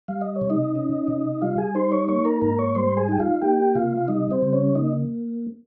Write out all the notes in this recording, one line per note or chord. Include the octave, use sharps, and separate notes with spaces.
G3 F5
D#5
C#5
C3
D#4 D#5
C#4
C3
G3 F4 F5
G#4 G#5
D#4 C5 C6
C#5 C#6
A#3 C#5 C#6
A#4 A#5
G#2 A#4 A#5
C#5 C#6
G3 C5 C6
G#4 G#5
D#4 G5
F4 F5
A#3 G4 G5
C3 F4 F5
F5
G3 D#4 D#5
C4 C5
C#3
C#4 C#5
A#3 D#4 D#5